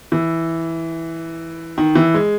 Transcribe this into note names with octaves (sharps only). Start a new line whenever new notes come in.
E3
D#3
E3
G#3